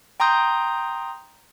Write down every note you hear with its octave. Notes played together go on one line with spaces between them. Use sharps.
G5 A#5 C6 D#6 G6